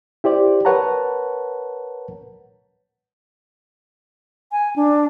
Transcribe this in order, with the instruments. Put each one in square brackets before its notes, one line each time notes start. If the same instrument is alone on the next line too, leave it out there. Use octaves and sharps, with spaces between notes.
[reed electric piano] E4 G4 C5 D5
A#4 B4 C#5 F#5 A5 A#5
[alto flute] G#5
D4